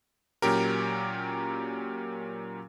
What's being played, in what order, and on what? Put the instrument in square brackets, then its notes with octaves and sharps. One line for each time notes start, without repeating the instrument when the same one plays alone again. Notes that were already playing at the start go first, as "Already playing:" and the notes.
[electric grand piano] A#2 F#3 C#4 G4 A#4